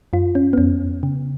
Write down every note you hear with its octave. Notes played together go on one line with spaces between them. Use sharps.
F#2 F4
C#4
B3
F2 C#4
C#3